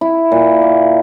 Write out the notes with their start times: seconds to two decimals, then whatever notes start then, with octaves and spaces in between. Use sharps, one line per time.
0.01 E4
0.32 A#2
0.62 A#3